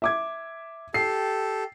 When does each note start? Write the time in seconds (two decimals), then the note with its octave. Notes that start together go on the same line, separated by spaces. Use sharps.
0.02 E5 D6 G#6
0.94 G4 A4 C7